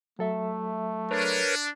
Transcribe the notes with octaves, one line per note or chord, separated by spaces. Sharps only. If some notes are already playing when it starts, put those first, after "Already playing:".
F#3 A3 A4 E5
D4 A#4 B4 C#5